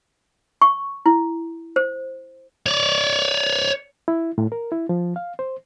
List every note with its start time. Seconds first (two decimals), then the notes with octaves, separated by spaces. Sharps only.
0.61 C#6
1.06 E4
1.76 C5
2.66 C#5 D5
4.08 E4
4.38 A2
4.52 A#4
4.72 E4
4.89 F3
5.16 F5
5.39 C5